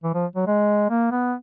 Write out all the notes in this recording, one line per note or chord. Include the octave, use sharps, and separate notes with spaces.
E3
F3
F#3
G#3
A#3
B3